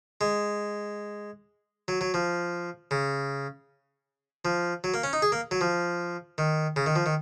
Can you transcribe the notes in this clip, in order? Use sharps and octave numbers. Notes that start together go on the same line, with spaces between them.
G#3
F#3
F#3
F3
C#3
F3
F#3
A#3
C#4
D#4
G#4
A#3
F#3
F3
D#3
C#3
D#3
F3
D#3